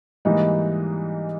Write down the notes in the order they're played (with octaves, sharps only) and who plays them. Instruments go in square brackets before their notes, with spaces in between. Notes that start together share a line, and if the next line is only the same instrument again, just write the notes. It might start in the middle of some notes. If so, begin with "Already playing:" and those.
[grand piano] G#2 E3 G3 A#3 D#4